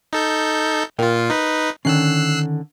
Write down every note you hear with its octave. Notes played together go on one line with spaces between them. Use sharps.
D#4 A4 G6
A#2 F4 A#4 F5 G5
D#4 B4
D3 D#3 C#4 E6 F#6 C7